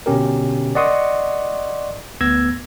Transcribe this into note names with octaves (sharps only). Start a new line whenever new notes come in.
B2 D3 C#4 G4 A#4
D5 D#5 F#5 C6 C#6 D#6
D2 B3 E6 G#6 A#6